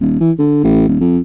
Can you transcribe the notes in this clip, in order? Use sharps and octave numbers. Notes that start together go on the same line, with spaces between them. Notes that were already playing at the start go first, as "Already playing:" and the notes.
D#1
E3
D3
A1
D#1
F2